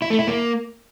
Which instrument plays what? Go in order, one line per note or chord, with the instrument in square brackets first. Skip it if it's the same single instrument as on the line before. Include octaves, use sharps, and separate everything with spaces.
[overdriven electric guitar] E4
A3
E4
A#3